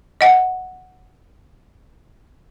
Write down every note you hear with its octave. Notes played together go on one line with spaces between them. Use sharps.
D#5 F#5